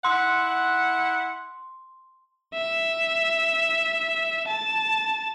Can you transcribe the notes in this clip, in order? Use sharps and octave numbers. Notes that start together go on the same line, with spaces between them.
E4 F#5 C6
E5
A5